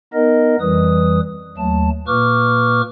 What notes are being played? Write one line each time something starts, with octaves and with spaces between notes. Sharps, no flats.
B3 D#4 A#4 D#5
F2 E3 G3 B4 D#6
D#2 F#3 A3 A5
A#2 A#3 B4 C#6 D6 F6